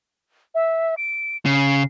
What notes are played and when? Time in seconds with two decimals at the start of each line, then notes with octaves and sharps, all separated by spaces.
0.55 E5
0.97 D7
1.45 C#3 C7